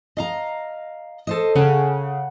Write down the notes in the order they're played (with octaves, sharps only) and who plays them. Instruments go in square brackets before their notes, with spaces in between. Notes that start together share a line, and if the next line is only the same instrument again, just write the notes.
[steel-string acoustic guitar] D#5 F5 A#5
A4 C5 D#5
[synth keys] C#3 [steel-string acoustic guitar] F#5